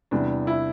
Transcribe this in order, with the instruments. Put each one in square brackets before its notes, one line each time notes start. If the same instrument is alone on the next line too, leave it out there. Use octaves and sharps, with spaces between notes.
[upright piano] E2 C3 E3 G3 D4
E4